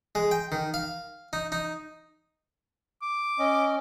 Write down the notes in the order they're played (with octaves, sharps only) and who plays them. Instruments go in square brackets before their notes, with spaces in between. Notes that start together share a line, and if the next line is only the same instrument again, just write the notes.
[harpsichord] G#3
G5
D#3
F5
D#4
D#4
[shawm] D6
[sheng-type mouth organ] C#4 D#5